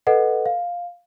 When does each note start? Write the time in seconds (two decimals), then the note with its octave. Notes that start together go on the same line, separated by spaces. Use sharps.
0.07 A4 B4 D#5 F#5
0.46 F5